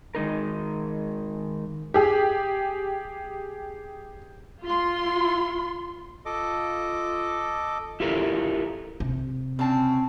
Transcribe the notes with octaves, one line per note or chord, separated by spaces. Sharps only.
D#3 G#3 D#4 A#4
G4 G#4
F4 C6
F4 A4 D#5 D6
E4 F4 G4 A4 A#4
C3
C#3 C4 A5